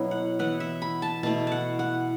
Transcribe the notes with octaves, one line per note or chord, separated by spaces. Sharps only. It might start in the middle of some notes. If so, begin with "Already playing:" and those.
Already playing: B2 F#3 B3 E4
F#5
E3 B3 E4 F#5
E5
B5
A5
B2 A3 E4 A5
F#5 A5
F#5